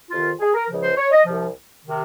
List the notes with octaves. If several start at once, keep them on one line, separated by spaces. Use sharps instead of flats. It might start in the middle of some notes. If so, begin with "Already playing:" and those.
F2 C3 D#3 F4
G#4
A#4
C#2 C#3 F3
C5
C#5
D#5
C2 C3 F3
C3 D#3